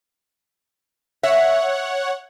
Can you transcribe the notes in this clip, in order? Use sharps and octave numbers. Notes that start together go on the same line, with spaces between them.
C#5 E5 F#5